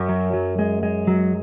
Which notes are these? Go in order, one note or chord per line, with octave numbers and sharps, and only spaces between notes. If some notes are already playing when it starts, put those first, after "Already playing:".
Already playing: F#2
F#3
F#3
G#3
G#3
F#3